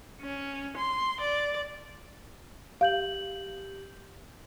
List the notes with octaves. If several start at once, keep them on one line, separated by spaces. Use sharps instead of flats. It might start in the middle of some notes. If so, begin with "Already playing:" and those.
C#4
C6
D5
G4 F5 G6 F#7